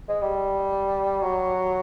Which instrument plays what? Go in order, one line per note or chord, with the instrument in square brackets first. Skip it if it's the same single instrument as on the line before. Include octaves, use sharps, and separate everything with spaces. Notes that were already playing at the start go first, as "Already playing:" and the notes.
[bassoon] G#3
G3
F#3